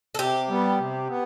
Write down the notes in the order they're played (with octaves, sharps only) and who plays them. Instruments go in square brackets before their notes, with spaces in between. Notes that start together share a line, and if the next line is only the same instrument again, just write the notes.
[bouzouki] A4
[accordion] C3 [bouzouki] G4
[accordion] G3 B3
C3
B3